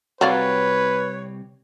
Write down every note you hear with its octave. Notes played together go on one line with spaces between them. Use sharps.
C2 F#3 C4 G4 B4 C#5 D5 F5